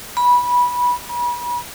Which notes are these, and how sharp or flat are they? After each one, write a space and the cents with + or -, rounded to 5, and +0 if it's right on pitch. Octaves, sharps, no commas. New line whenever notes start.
B5 -15
B5 -35